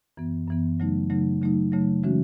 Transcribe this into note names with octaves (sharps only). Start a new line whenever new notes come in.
F#2 E3 B3
F#2 E3 B3
C#3 F#3 A3 D#4
C#3 F#3 A3 D#4
C#3 F#3 A3 D#4
C#3 F#3 A3 D#4
C#3 E3 G#3 C#4 F#4